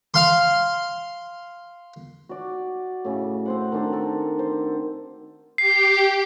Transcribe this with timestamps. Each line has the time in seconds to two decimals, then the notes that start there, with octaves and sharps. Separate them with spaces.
0.14 F5 C6
2.29 F#4 D5
3.05 A2 C#3
3.46 C4 C5 F#5
3.72 D#3 D4 A4
3.93 A4 A#4
4.39 C5
5.58 G4 C7